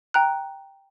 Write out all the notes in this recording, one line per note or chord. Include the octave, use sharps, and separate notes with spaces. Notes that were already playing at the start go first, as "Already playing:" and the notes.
G5 A#5 F#6